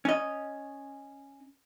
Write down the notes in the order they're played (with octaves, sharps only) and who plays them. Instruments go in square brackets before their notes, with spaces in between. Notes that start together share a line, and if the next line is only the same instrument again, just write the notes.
[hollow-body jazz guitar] C#4 D#5